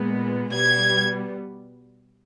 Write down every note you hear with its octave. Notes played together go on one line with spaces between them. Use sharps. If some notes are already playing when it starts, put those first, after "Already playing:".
Already playing: A#2 G#3 B3
B2 G3 B3 G#6